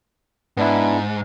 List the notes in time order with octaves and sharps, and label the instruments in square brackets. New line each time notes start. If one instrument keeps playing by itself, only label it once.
[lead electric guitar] G#2 [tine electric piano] B3 D4 E4